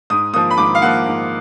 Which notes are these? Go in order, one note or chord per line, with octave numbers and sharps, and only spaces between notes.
G#2 D#6
F3 A#3 D#6
B5
G#2 D6
F5
F3 A#3 F#5
G#2